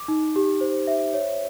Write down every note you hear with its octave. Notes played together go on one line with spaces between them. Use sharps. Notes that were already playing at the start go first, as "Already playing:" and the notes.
Already playing: D6
D#4
G4
C5
E5
C#5